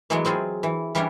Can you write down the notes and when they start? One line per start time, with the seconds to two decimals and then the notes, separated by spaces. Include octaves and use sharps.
0.10 E3 F#3 G#3 A3 B3 E4
0.25 F#3 C4 F4 G#4
0.63 E3
0.95 E3 G3 C#4 D4 E4